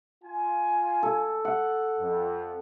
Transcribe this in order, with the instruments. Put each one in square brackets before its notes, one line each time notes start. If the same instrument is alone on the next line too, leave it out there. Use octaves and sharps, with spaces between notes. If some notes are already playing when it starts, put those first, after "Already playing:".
[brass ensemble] F4 G#5
[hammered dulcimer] A4
F#5
[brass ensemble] F2